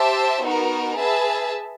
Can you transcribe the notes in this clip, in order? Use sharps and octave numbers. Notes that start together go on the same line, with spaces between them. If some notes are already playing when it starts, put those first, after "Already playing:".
Already playing: G4 C5 E5 A5
B3 D#4 F#4 A#4
G#4 B4 E5 A5